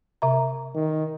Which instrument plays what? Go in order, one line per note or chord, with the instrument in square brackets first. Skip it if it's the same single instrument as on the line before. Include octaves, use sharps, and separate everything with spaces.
[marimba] C3 E5 A#5
[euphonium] D#3